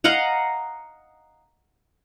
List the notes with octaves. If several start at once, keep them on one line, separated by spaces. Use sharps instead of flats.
D#5 F5 F#5 A#5